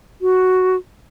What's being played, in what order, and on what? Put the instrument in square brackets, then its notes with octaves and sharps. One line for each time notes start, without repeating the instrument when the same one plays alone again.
[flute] F#4